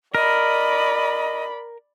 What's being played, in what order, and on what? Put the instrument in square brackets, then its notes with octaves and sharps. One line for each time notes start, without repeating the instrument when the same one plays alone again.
[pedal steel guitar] A#4 [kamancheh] D5 B5 [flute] D#5